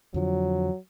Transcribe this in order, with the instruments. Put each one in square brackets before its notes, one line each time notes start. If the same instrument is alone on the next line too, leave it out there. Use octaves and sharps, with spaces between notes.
[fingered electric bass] F2 D3 F3 [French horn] F#3